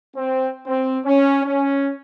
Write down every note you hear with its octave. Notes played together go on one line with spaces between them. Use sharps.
C4
C4
C#4
C#4